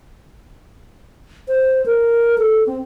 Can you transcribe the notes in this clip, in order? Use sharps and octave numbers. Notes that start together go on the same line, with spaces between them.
C5
A#4
A4
C4